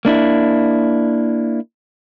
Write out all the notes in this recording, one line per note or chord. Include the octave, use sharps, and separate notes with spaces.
A#3 D4 E4